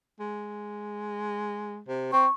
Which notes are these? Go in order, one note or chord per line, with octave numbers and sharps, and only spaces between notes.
G#3
C3
C4 C#6